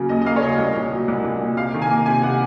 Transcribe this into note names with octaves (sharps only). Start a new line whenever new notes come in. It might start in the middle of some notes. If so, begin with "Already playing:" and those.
Already playing: C#3 F#3 A#3
D#2 D#5
D#5
A#3 F5
C#5
C#3 D#5
C2
A#2
F#3
C2
C2
A#2
C3 F5
D#3
G#5
A#3
C3 G#5
C3 F#5